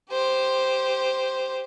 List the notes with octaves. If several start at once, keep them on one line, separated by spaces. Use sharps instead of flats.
G4 C5